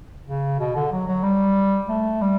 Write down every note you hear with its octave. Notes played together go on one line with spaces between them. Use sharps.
C#3
B2
D3
F#3
F#3
G3
A3
G3